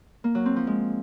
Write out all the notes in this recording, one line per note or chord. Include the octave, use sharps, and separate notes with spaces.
A#3
F#3
C4
F3
G#3